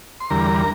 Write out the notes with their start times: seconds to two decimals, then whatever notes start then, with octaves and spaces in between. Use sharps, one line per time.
0.20 C6
0.30 E2 D3 G3 A#4 A#5